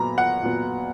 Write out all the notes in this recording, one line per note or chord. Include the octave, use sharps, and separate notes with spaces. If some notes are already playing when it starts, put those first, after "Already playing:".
Already playing: A#2 F#3 B3 A#5 B5
F#5
A#2 F#3 B3